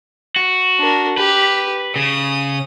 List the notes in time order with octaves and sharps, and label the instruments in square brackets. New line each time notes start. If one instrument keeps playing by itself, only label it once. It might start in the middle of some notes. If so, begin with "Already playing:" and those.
[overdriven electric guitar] F#4
[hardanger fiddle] D4 A#4
[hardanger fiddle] G4 [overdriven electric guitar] B4
[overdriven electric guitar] C#3 [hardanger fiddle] D#6